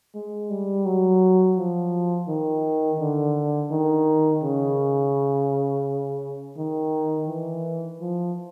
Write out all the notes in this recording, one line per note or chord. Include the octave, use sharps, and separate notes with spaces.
G#3
G3
F#3
F3
D#3
D3
D#3
C#3
D#3
E3
F3